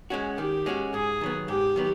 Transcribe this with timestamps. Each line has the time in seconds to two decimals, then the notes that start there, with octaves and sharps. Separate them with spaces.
0.10 G#3 C#4 F#4
0.37 D#3 G4
0.66 G#3 C#4 F#4
0.94 G#2 G#4
1.21 D#3 F#3 B3
1.48 G#2 G4
1.76 D#3 F#3 B3